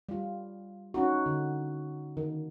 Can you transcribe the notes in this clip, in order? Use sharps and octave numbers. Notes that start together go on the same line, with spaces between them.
G3 F4
C#4 D#4 F#4
D3
D#3